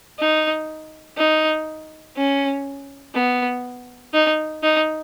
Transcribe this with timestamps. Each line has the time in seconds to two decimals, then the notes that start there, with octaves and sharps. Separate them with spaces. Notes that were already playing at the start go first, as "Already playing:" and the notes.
0.19 D#4
1.17 D#4
2.17 C#4
3.15 B3
4.14 D#4
4.63 D#4